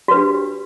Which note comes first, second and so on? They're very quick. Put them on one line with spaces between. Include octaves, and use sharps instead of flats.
F#4 B4 D4 G4